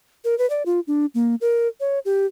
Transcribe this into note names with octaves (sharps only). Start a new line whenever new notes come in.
A#4
B4
D5
F4
D4
A#3
A#4
C#5
G4